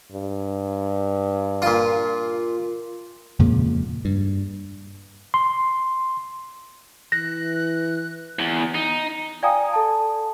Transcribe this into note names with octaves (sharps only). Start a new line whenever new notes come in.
G2
A#2 F4
F2 A#2 C#3 G#3
G2
C6
E3 F#6 A#6
E2
D#4
D5 F5 G5 G#5 A#5 D#6
A4 A5